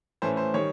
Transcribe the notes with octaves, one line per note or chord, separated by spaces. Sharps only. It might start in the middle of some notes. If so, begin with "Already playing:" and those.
A2 E3 A3 C#4 C5
C5
D#3 G3 C#5